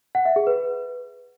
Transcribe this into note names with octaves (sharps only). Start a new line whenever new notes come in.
F#5
E5
G#4
B4